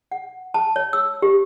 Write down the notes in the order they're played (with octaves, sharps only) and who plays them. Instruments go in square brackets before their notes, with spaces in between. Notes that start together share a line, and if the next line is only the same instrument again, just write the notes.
[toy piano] F#5
A5
C#5
E6
G4